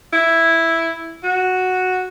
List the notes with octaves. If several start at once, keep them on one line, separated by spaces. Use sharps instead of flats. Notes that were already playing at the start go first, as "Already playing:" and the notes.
E4
F#4